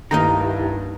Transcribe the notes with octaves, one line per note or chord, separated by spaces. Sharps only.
C2 G2 D#3 A#3 D#4 E4 G4 A#5